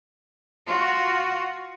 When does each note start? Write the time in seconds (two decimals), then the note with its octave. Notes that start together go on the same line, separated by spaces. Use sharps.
0.67 F4 F#4